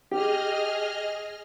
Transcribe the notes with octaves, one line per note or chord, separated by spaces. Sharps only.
G4 G#4 D#5 F6